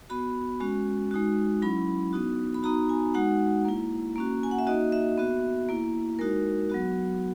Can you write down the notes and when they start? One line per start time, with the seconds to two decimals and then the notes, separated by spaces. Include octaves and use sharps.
0.10 B3 F#4 B5
0.60 G#3 C#4 F#4
1.11 G#3 D#4 F#4
1.62 F#3 C#4 E4 B5
2.13 B3 D#4 F#4
2.54 B5
2.63 B3 D#4 F#4 A#5
2.89 G#5
3.14 G#3 D#4 F#4 F#5
3.65 A#3 E4
4.16 A#3 C#4 F#4
4.43 G#5
4.51 F#5
4.59 E5
4.67 A#3 D#4 F#4 D#5
4.92 E5
5.18 B3 F#4
5.69 A#3 E4
6.19 G#3 D#4 F#4 A#4
6.70 F#3 B3 F#4